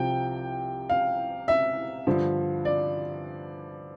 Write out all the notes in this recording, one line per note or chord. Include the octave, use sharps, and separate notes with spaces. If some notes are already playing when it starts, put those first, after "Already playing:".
Already playing: C2 C3 F3 G5
F5
E5
G2 D3 F3
D5